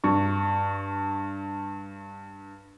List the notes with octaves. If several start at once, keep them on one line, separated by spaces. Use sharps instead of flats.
G2 C#6